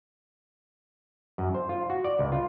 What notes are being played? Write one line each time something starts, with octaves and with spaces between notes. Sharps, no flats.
F#2
C5
F4
F#4
D5
C#2
F4